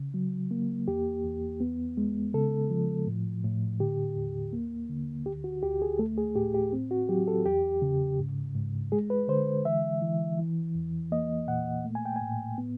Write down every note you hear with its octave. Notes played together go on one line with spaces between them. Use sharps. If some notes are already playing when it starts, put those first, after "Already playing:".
Already playing: C#3
F#3
A#3
E2 G4
E2
B3
G#3
C#3 A4
F3
A2
A2
D3 G4
D#2
A#3
D3
D2 G4
F#4
D2 G4
G#4
A3 A4
G#4
A2 G4
G4
C4
F#4
F#3 G4
A4
E2 G4
C#3
G#2
G#2
G#3 G#4
B4
D3 C5
E3 E5
E3
E3
E2
A#3 D#5
A#2 F#5
A3
G#5
G5
G#5
A2
B3